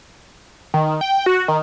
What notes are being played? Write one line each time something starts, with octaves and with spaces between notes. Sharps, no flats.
D#3
G5
F#4
D#3